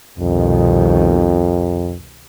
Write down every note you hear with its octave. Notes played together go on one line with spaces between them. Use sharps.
C2 F2 B2 D#3